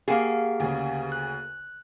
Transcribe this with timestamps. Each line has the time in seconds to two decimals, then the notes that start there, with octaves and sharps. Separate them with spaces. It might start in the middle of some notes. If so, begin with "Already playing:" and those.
0.08 A#3 G4 G#4 F5 F#5
0.60 D2 C#3
1.12 F#6